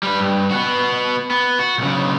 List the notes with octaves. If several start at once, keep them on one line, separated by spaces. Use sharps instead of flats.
G3 B4
G2
B3 F#4
B3
F#4
B1 C#3